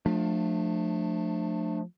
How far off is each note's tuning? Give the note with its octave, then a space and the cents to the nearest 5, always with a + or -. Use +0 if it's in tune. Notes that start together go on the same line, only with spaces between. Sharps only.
F3 +25 A3 +0 D4 +25